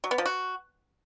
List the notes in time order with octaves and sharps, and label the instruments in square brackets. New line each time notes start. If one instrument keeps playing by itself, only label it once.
[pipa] F#3
B3
F3
F#4